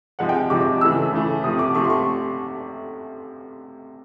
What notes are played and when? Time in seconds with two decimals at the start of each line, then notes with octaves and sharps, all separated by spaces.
0.19 C3 F3 G#3 F#5
0.29 G5
0.50 C3 F3 G#3 D6
0.81 C#3 E3 A3 E6
1.13 C#3 E3 A3
1.44 C3 F3 A3 D#6
1.59 D6
1.75 C3 F3 A3 C#6
1.84 C6
1.90 C#6